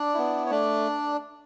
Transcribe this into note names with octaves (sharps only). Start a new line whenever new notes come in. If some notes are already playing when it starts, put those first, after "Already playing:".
Already playing: D4 D5
B3 E4
C#5
A3 D4 D5